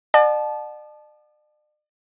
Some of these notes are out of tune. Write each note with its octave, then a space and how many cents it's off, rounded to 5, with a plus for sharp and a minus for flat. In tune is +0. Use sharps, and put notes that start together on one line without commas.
D5 +45 F#5 -20 A5 -20